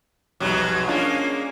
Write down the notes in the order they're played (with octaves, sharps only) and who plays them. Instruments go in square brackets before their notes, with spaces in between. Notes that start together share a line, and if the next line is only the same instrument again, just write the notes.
[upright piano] C2 F2 [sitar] G#2 B2 F#3
[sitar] G#3 A#3 [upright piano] C#4 D4 F4